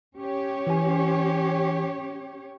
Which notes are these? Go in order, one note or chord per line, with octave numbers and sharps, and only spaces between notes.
C#4 G4 C#5
E3 G#5